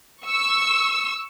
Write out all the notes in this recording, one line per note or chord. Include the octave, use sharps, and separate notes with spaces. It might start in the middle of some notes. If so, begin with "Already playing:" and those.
C#6 E6